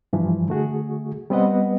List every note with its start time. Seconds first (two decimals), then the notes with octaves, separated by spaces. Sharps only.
0.13 G2 E3 F3
0.49 D3 A3 F#4 G#4
1.30 G3 B3 C4 B4 D#5 F#5